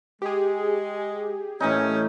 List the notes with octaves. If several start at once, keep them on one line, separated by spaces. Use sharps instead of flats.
G#3 G4 G#4
A2 E3 C#4 D#4